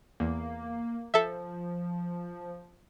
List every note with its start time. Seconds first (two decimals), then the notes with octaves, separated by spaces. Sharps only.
0.20 E2 A#3
1.14 F3 A4 E5